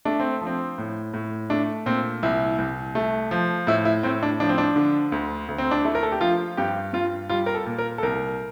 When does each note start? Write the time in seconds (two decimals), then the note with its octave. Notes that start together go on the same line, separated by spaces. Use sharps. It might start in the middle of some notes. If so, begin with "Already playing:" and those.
0.05 A3 D4
0.20 C4
0.41 F3
0.46 C4
0.78 A2
1.14 A2
1.50 A3 D4
1.86 A#2 C4
2.23 C2 E4
2.58 C2
2.95 A3
3.31 F3
3.67 A2 E4
3.85 E4
4.03 A2 C4
4.23 D4
4.40 F3 D4
4.49 C4
4.58 D4
4.76 D3
5.12 D2
5.49 D2
5.58 C4
5.71 D4
5.85 A3 E4
5.95 A#4
6.03 A4
6.12 G4
6.21 F3 F4
6.57 G2 G4
6.93 G2 F4
7.29 G3 F4
7.46 A#4
7.55 A4
7.66 A#2
7.78 A#4
7.98 A4
8.03 C2 A#4